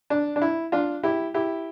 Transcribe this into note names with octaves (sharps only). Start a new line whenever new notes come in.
D4
D4
E4
D4 F4
E4 G4
E4 G4